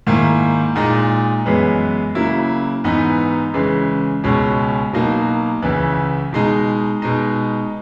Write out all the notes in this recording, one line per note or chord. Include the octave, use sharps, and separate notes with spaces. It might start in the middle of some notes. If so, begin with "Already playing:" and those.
G#2 D#3 A#3 E4
A#2 G#3 D#4
F#2 E3 G#3 B3
C#3 F#3 A#3 E4
G#2 E3 B3 D#4
C#3 E3 G#3
C#2 B2 G#3 C#4
B2 F#3 A#3 D#4
C#2 C#3 E3
B2 G#3 D#4
B2 G#3 D#4